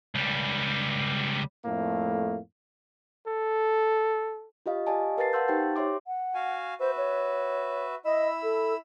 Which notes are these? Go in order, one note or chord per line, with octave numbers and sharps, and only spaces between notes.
C#2 G3
F2 A2 A3 A#3
A4
F4 G4 D#5 F5
G4 D5 D#5 F5 G#5 A5
A#4 B4 F5 A5 A6 C7
F5 F#5 A5 C6 E6 G6
D#4 G4 C5 G5 A6
G4 C#5 E5 C6 D6
F#5
F#4 F5 G#5
F#4 B4 C5 E5
C#5
E4 D#5 B5 E6
A4